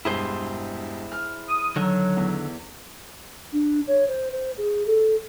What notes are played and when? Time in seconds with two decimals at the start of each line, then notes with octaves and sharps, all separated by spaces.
0.05 E1 G2 E4 G#4 C5 C7
1.12 F6
1.49 D#6
1.76 D3 D#3 F#3
2.17 E2
3.53 D4
3.87 C#5
4.08 C5
4.32 C5
4.58 G#4
4.86 A4